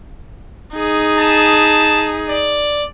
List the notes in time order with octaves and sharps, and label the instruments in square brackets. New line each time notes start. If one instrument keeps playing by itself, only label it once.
[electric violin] D#4 G#4
[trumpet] A5
D5